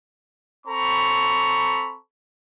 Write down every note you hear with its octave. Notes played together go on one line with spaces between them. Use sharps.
C4 A4 A#5 B5 C#6